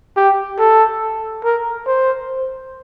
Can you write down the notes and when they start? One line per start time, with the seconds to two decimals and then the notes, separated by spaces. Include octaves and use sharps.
0.17 G4
0.59 A4
1.44 A#4
1.87 C5